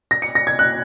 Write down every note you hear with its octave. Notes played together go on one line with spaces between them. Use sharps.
A#6
C#7
A#6
G#6
F#6